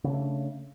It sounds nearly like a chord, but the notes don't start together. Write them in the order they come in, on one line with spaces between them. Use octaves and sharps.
C#3 C#4 D4 A3